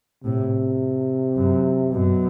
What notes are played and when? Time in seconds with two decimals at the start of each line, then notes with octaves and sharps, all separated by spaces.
0.24 A2 C3
1.37 F#2
1.92 F#2 B2